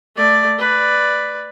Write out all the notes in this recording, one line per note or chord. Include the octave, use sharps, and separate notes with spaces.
A3 D5
B4 D5